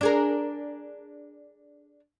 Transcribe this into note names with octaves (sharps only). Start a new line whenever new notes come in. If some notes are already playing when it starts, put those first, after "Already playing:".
D4 G#4 A#4